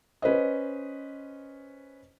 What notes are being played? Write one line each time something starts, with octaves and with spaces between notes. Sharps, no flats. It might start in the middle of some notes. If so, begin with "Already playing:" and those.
C#4 B4 C5 D#5